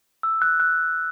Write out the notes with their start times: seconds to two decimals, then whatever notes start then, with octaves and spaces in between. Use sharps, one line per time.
0.23 E6
0.42 F#6
0.60 F#6